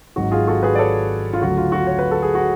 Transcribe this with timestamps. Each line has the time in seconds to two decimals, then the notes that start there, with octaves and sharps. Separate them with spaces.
0.16 G#1 G#2 F#3 F#4
0.31 F4 G#4
0.47 F#4 A4
0.63 G#4 B4
0.75 D5
0.79 A4 C#5
1.33 F4
1.41 D2 C#3 F#3 A3 F#4
1.57 F4
1.72 F#4
1.87 C#5
1.99 B4
2.11 A4
2.22 G#4
2.35 F#4